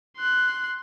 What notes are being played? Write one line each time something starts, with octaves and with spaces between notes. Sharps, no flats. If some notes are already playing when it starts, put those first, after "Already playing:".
C6 F#6